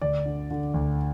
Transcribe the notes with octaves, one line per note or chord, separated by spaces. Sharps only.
D2 D5
D3
D3
D2